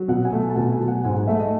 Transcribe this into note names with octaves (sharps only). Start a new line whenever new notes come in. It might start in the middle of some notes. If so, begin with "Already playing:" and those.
Already playing: F#3
B2 F#5
G#5
A3
F#5
A5
B2 G#5
G#5
F#3
F#5
G#2 G#5
F#5
A3 E5
D#5